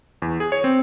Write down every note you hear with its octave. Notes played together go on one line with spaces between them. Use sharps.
E2
G#4
C#5
C4